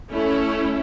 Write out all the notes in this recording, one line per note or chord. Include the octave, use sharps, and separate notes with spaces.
A3 C#4 E4